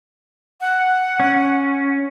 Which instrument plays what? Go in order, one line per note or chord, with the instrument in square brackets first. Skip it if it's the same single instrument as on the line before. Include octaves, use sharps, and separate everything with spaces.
[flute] F#5
[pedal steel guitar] C#4